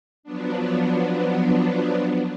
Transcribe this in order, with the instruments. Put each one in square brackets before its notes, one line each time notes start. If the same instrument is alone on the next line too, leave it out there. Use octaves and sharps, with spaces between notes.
[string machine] F3 F#3 B3 D4